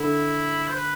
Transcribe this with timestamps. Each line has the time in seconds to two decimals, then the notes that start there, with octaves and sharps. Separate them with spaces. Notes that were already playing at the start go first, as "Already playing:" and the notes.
Already playing: D3 E4
0.68 C5
0.76 B4